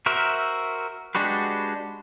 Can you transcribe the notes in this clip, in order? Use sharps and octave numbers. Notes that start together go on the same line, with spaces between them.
F#4 A#4 C5 E5
G#3 D4 F#4 G4 B4